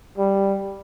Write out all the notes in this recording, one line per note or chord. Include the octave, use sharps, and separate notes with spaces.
G3